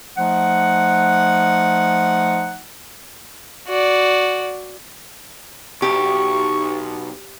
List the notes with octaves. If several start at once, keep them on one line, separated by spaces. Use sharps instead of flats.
F3 A3 D#4 F#5
F#4 D5
B1 G4 C#6